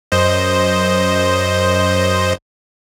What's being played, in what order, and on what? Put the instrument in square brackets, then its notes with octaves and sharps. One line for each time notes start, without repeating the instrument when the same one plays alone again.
[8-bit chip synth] F#2 C5 D#5